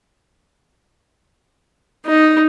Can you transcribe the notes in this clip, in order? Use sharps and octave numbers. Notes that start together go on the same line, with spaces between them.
D#4